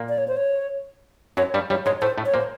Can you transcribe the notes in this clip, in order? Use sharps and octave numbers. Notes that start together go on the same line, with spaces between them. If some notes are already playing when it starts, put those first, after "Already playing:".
Already playing: A#2 A#3
D5
C#5
C5
C#5
F#2 F#3 C#5
G2 G3 D5
G2 G3 C#5
G#2 G#3 C#5
A2 A3 C5
A2 A3
C#5
A#2 A#3 C5